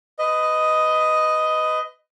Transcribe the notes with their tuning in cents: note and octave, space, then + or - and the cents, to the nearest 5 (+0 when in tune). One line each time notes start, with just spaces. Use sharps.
B4 +20 D#5 +5